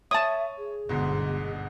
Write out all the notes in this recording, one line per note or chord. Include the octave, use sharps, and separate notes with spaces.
C#5 E5 A5 D#6 D#7
G#4
G1 D2 G#2 B2 D3